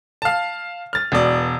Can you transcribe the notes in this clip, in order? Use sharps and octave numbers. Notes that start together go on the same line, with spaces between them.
F5 A5
F6 A6
E1 B2 D5